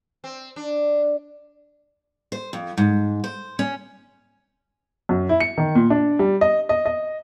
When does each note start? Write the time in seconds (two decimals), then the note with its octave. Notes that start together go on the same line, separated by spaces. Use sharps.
0.24 C4
0.56 D4
2.32 C5
2.53 F2
2.78 G#2
3.24 C5
3.59 C#4
5.09 F#2
5.29 E4
5.40 C#7
5.58 D#3
5.75 A#2
5.90 D4
6.19 G3
6.41 D#5
6.69 D#5
6.86 D#5